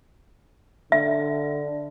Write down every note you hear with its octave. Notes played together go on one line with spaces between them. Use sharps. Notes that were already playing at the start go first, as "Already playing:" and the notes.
D3 E5